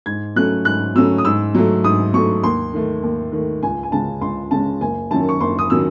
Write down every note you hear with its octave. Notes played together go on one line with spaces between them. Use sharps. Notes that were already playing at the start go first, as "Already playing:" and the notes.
G#2 G#6
F#3 A3 C#4 F#6
G#2 F#6
F#3 A3 C#4 E6
D#6
G#2 E6
F#3 A3
G#2 D#6
F#3 A3 C#6
D#2 C6
D#3 A3
D#2
D#3 A3
C#2 G#5
G#5
C#3 G#3 C#4 A5
C#2 C6
C#3 G#3 C#4 A5
F#1 G#5
F#2 D#3 F#3 C#4 A5
C#6
F#1 C6
D#6
D#3 F#3 C#4 E6